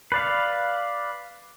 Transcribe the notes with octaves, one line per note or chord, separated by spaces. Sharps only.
B4 D5 F5